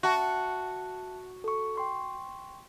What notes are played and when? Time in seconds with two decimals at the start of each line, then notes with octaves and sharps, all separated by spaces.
0.03 F#4 E5 A5
1.44 A4 C#6
1.76 G5 C6 C#6